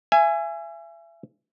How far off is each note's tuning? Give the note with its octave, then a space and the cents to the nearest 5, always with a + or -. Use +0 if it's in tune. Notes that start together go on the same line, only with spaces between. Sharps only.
E5 +35 G#5 +0